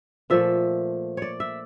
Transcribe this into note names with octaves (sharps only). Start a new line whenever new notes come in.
A#2 F3 A3 E5
C#5 D5
E5